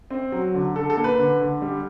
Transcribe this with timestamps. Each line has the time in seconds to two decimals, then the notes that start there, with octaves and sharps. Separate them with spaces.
0.11 C4
0.32 F#3
0.54 D3
0.75 D3 A4
0.90 A4
0.97 A#3
1.04 B4
1.19 D3
1.40 D3
1.62 G3